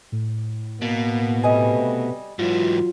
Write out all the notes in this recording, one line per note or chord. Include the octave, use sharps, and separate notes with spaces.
A2
B2 A#3
C3 G3 A3 B4 D#5 G#5
G#2 E3 F#3 F4